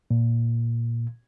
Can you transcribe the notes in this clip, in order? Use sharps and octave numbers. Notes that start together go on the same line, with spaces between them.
A#2